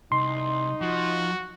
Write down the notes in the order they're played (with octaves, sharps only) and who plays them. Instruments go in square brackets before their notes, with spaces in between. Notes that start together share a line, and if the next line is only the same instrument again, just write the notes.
[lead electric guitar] C2 [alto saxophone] D#4 [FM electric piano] C6
[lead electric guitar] F3 [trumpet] F#4